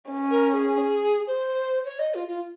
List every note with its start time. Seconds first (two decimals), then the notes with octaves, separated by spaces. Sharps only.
0.10 C#4
0.31 A#4
0.50 A#4
0.53 G#4
1.27 C5
1.85 C#5
1.99 D#5
2.15 F4
2.28 F4